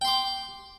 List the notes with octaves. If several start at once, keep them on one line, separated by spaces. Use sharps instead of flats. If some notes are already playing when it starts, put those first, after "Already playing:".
G5 C6 D6